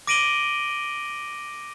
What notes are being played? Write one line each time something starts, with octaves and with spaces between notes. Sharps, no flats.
D6 A#6 D7 D#7 F#7 G7